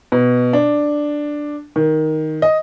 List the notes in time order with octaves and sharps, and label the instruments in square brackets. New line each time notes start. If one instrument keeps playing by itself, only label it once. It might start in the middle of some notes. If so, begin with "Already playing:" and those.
[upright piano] B2
D4
D#3
D#5